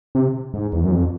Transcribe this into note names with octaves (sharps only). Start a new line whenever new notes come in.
C3
G#2
E2
F#2
F2